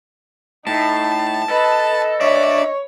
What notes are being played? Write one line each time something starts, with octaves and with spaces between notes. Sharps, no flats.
A2 D#4 A5
A4 B4 D#5
D4 C#5 D5 E5